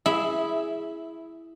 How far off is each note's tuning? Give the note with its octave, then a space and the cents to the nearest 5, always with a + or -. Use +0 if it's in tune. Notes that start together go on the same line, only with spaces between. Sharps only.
E4 +0 G#4 +0 E5 -15